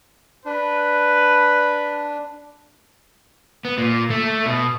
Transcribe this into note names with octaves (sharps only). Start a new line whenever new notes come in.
D4 B4
B3
A#2
A3
B2